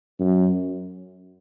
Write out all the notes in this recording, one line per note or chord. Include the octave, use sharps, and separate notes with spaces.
F#2